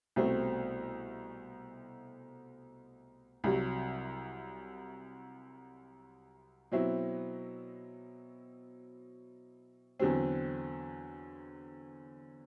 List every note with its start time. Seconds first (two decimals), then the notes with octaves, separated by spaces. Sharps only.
0.16 C2 B2 A3 C4
3.44 C2 C3 F#3
6.72 B2 F#3 C4 E4
10.00 E2 D3 F#3 C4